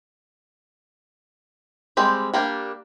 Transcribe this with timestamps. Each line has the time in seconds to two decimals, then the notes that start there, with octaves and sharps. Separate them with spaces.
1.97 G3 G#3 C4 G4
2.34 G3 A#3 D4 G4